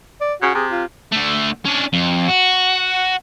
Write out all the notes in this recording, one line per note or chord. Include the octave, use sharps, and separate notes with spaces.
D5
C#3 F#4
C3 G#4
F4
D3 A3
C#4 D4
F2
F#4